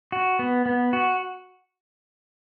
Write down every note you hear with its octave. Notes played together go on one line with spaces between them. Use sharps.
F#4
B3
B3
F#4